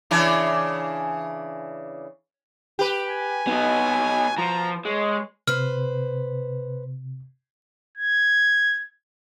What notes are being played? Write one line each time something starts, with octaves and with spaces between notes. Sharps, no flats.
C#3 E3 D4
G4 B4
G#5
B2 B3 D#4
F3 A#5
G#3 C#5
C3 B4 C5 F6
G#6